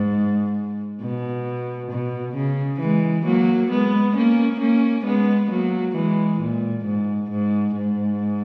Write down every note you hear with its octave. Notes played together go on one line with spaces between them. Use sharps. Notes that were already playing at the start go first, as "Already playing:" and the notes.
Already playing: G#2
B2
B2
C#3
E3 G#3
F#3 A#3
G#3 B3
A#3 C#4
A#3 C#4
G#3 B3
F#3 A#3
E3 G#3
A#2
G#2
G#2
G#2